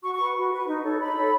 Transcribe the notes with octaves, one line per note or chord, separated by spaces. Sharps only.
F#4 C#6
B4 C#6
F#4
B4
D#4
A4 C#5
D#4 B5
A4 C#5